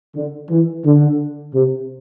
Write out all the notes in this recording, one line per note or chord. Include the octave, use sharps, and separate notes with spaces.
D3
E3
D3
C3